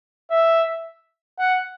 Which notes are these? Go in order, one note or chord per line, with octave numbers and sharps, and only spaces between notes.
E5
F#5